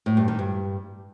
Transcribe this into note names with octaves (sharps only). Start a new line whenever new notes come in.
A2
G2
D#3
G2